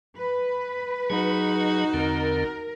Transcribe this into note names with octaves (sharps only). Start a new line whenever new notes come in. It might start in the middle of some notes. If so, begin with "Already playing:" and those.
B4
F#3 D#4 F#4 G#4
E2 D3 C4 A#4